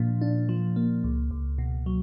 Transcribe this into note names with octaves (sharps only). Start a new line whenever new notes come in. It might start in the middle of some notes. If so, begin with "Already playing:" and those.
Already playing: A#2 F3 A#3 D4
D4
F3
A#3
C#2
C#2
B2
F#3